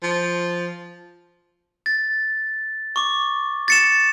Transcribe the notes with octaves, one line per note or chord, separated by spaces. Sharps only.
F3
A6
C#6 D6
A6 C#7 E7